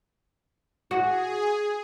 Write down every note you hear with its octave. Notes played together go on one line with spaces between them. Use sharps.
F#4 G#4